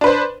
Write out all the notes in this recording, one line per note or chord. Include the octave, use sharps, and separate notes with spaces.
D4 B4 C5